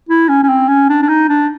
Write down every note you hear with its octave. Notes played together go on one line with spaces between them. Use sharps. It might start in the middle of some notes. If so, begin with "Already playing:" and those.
E4
C#4
C#4
C4
C#4
D4
D4
D#4
D4